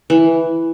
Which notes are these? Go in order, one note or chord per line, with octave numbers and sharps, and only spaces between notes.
E3